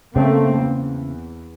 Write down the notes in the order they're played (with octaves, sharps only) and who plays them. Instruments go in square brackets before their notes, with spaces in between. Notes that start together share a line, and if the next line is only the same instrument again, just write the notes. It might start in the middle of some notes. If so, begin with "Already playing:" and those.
[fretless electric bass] C#3 [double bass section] A3 A#3 C4
[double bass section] E2